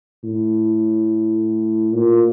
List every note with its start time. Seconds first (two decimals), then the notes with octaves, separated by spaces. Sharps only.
0.24 A2
1.93 A#2